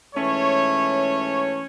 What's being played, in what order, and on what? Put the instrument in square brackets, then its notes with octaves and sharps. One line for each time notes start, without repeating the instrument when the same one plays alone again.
[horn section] G#2 E3 A3 C#4 C#5